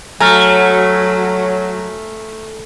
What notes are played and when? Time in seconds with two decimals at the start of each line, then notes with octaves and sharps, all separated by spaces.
0.20 F#3 A3 G#5 A#5 F6